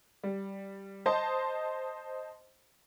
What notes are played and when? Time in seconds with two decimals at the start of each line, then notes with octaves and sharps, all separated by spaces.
0.24 G3
1.06 C5 D#5 A5 C6